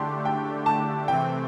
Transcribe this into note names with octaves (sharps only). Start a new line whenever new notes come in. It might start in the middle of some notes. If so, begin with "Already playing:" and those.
Already playing: D3 A3 D4 G4 C6
G5
A5
C3 E3 A3 C4 G5